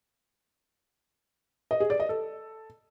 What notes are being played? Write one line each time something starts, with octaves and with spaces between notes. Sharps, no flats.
D#5
G#4
D5
D#5
A4